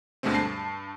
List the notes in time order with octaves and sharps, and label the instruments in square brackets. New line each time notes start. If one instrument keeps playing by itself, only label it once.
[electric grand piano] D2 B2 D3 G#3 A3 C4
G2 A5 C7